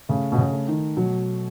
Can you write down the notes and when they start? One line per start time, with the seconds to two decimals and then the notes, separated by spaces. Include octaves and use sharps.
0.09 C#3 A3
0.32 B2
0.38 C#3
0.53 A3
0.68 D#3
0.97 B2 F#3